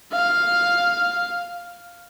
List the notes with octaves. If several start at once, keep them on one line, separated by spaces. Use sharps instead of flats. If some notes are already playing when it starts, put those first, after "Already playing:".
F5